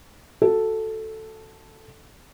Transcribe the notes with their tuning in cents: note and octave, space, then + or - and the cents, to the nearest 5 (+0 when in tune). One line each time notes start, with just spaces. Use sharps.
F#4 +0 A4 +0